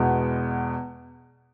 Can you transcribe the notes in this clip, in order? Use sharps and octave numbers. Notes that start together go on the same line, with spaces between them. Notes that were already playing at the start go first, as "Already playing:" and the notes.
Already playing: E2 B2 G#3 B3